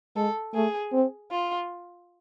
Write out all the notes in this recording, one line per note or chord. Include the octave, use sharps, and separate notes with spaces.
G#3 A4
A3 G#4
C4
F4